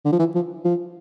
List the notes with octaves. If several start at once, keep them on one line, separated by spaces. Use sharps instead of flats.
D3
F3
E3
F3
F3